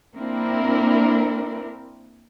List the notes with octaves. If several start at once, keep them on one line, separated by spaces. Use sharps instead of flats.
A#3 C4 D4 E4 A#4